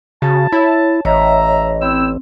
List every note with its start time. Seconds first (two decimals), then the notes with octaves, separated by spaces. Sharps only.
0.22 C#3 F#4 A5
0.52 E4 C#5
1.05 A1 C#5 D#5 E5 A#5
1.82 C4 E4 G5 E6